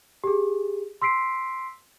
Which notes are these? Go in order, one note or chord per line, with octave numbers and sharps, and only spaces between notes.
G4 G#4
C6 E6 B6 C7 D7